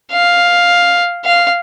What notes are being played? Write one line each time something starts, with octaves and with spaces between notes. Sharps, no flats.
F5
F5